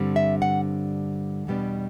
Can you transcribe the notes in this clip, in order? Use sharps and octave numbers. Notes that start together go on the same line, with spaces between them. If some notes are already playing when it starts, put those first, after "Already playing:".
Already playing: G2 D3 G3 C4
E5
F#5
E2 B2 G3 B3 D4